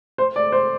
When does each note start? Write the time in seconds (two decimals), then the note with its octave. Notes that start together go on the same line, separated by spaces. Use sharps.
0.18 C5
0.36 D5
0.52 C5